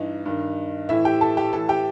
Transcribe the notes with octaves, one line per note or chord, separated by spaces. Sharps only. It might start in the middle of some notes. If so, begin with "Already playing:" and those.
Already playing: G2 E3 D#4
G2 D#3
A2 E3 E4 E5
G4 G5
A4 A5
G4 G5
A2 E3 A4 A5
G4 G5